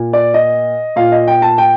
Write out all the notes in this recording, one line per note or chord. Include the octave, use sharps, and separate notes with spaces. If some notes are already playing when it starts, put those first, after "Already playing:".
Already playing: A#2
D5
D#5
A#2 F5
D#5
G5
A5
G5